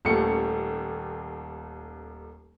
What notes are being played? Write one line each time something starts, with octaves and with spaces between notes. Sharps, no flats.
D#1 D#2 A3 C#7